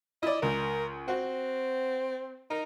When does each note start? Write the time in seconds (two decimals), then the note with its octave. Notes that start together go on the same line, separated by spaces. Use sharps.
0.23 E4 D5 D#5
0.42 C#2 A#4
1.08 C4 F#4
2.50 D#4 A#4